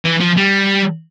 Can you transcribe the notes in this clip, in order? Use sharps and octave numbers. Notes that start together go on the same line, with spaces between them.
E3
F3
G3